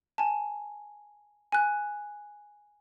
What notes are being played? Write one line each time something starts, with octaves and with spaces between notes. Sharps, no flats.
G#5 A5
G#5 F#6